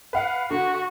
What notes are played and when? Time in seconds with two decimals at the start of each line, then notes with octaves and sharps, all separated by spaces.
0.13 B4 F5 F#5
0.51 D3 F#4